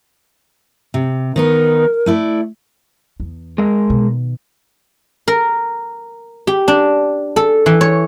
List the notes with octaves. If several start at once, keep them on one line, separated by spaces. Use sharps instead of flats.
C3
D#3 B3 D#4 A#4
A3 E4 D5
E2
G#3 A#4
B2 D#3
A#4
G4
D4
A4
E3
C#5